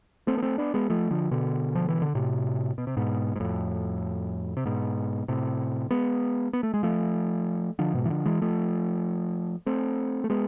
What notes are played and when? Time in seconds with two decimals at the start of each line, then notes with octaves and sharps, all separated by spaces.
0.27 A3 C4
0.38 B3
0.42 A3 C4
0.58 B3 D4
0.74 G#3 B3
0.90 F3 A3
1.11 D3 F3
1.31 B2 D3
1.75 F3
1.89 E3
2.02 D3
2.15 A2 C3
2.78 B2
2.87 C3
2.97 G#2 B2
3.36 G#2
3.40 F2 A2
4.57 C3
4.66 G#2 B2
5.28 A2 C3
5.91 G#3 B3
6.53 B3
6.63 A3
6.74 G#3
6.83 F3 A3
7.79 D3 F3
7.94 G#2 B2
8.05 E3
8.10 D3 F3
8.26 E3 G#3
8.42 F3 A3
9.66 A3 C4
10.24 A3
10.30 G#3 B3